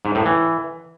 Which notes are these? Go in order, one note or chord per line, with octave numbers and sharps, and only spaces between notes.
G#2
A2
E3